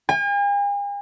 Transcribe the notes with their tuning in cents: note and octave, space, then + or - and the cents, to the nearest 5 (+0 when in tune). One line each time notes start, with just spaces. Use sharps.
G#5 -45